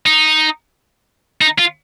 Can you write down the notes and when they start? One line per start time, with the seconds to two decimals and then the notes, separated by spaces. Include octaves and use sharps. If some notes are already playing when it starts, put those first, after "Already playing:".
0.06 D#4
1.41 D#4
1.59 F4